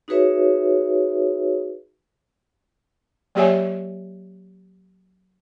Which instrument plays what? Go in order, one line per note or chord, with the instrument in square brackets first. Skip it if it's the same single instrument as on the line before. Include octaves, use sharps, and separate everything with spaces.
[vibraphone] D#4 F#4 G#4 B4 C#5 E5
[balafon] F#3 A#3 G4 C#5 E5 G#5